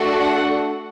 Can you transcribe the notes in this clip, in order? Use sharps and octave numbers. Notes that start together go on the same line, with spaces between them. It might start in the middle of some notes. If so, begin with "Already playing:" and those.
Already playing: A3 D4 F#4 A4
F#5